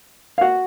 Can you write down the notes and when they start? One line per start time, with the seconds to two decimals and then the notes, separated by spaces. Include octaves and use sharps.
0.38 F5
0.41 F#4 F#5